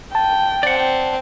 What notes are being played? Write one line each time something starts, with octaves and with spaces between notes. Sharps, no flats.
G5 A5
C4 D5 F#5